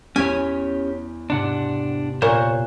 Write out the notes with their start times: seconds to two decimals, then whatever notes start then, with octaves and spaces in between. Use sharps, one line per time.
0.16 E2 C#4 G4 C#5 G#5 B6
1.30 G#2 C3 D4 F#5
2.22 A#2 C5 C#5 F#6